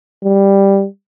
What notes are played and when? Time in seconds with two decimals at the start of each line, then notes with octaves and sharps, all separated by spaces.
0.23 G3